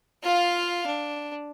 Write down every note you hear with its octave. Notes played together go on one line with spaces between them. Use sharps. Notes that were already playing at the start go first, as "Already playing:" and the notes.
F4 F5
D4